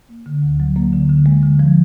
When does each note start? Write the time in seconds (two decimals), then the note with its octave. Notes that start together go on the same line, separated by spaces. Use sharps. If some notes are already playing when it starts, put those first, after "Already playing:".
0.09 A#3
0.26 D3
0.42 D2
0.60 F#3
0.76 A#3
0.93 D3
1.09 D3
1.26 G#3
1.43 D3
1.59 F3